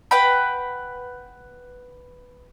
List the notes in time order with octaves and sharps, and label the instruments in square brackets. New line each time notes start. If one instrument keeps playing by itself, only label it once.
[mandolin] B4 F#5 G5 B5